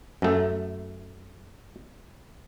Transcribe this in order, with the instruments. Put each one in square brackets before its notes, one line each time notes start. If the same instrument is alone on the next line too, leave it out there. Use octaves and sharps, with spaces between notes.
[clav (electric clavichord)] F#2 A3